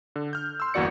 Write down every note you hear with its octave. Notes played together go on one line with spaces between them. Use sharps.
D3
F6 G6
C6 E6
G1 E2 A#3 F#4 D5 C#7